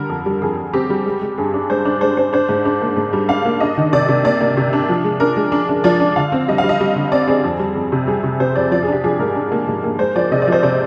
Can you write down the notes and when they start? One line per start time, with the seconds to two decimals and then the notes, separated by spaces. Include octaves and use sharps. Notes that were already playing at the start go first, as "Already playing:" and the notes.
Already playing: D3 G3 A#4
0.09 F2
0.26 G3
0.42 F2 G#4
0.58 F2
0.73 C4 G4
0.90 G3
1.06 G#3
1.21 G#3
1.38 G2 G#4
1.54 D4
1.70 G#3 C5
1.85 D4
2.01 G#3 C5
2.17 D4 C5
2.33 D4 C5
2.49 G#2
2.65 D4
2.81 A#3
2.96 G#2
3.13 G3
3.28 D4 F5
3.45 A#3
3.60 D4 D#5
3.77 D#3
3.92 C3 D5
4.08 C3
4.24 A#3 D5
4.41 A#3
4.57 C3
4.73 D4
4.89 F3
5.04 G#3
5.20 D4 A#4
5.36 G#3
5.52 D4
5.69 D4
5.84 F3 D5
6.00 D4
6.16 D3 F5
6.32 C4
6.48 G3 D#5
6.58 F5
6.64 G3
6.69 D#5
6.80 G3
6.96 D3
7.12 C4 D5
7.28 C4 G#4
7.44 F2
7.59 G3
7.76 F2
7.92 C3
8.07 G3 G#4
8.23 C3
8.40 C3 C5
8.55 F2 D5
8.71 F3 D5
8.83 G#4
8.87 D4
8.92 G4
9.04 F3 G#4
9.19 G#2 A#4
9.35 D4
9.52 A#3
9.68 G#2
9.84 A#3
9.99 G#3 C5
10.16 F3 D5
10.31 C3 D#5
10.42 D5
10.47 F3 C5
10.63 C3 D5